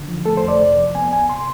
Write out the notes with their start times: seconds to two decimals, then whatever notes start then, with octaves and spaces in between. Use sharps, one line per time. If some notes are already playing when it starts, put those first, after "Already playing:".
Already playing: D3
0.08 F3
0.25 A3 A4
0.37 C5
0.43 F2
0.48 D5
0.61 C3
0.77 F3
0.95 B3 G#5
1.13 D2 G#5
1.29 C3 C6